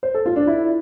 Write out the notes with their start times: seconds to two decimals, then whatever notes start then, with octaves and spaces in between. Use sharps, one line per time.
0.03 C5
0.14 A4
0.26 F4
0.36 D4
0.47 E4